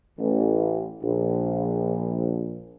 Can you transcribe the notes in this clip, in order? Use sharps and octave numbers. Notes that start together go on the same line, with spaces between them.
A1
A#1